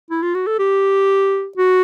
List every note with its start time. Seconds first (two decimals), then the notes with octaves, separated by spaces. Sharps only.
0.11 E4
0.23 F4
0.35 F#4
0.47 A4
0.59 G4
1.57 F#4